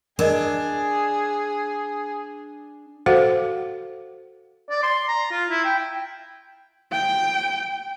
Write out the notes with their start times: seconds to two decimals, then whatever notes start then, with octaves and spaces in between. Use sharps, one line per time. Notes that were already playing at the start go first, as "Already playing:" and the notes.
0.19 D4 G#4 A#4 D5 D#5
3.06 F#4 A4 C5 F5 F#5
4.70 D5
4.83 C6
5.08 A#5
5.31 F4
5.50 E4
5.64 G5
6.92 G5